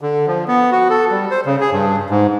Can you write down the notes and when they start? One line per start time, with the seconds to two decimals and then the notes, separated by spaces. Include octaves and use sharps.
0.01 D3
0.27 F3
0.48 B3
0.72 F#4
0.90 A4
1.11 G3
1.31 C5
1.46 C#3
1.61 G#4
1.72 G2
2.10 G#2